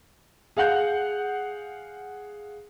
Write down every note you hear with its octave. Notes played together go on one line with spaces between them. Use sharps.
G#4 F5 F#5 F#6 G6